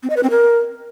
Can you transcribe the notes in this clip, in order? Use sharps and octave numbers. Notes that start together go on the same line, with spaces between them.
C4
D#5
B4
C4
A#4